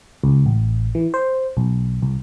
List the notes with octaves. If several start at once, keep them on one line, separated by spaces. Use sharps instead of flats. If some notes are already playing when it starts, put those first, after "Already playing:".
C#2
A1
E3
C5
B1
C2